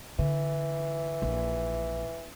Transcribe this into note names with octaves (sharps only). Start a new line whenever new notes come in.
D3 E3
A#1